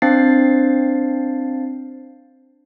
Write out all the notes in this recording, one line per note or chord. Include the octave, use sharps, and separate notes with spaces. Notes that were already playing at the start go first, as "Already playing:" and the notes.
C4 D4 C5 F5 A6 C7